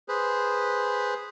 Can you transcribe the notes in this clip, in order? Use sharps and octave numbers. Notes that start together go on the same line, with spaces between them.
G#4 B4 C5